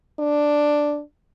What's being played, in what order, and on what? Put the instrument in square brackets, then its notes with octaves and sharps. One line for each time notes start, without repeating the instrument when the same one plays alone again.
[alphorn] D4